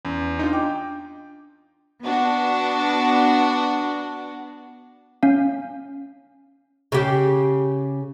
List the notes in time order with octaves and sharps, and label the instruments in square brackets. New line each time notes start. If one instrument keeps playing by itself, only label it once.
[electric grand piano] E2 [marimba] C#4
[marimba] D4 [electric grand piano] D#4 F4
[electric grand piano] G5 [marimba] D6
[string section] B3 D4 F#4
[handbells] C#4 F5
[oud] C#3 G4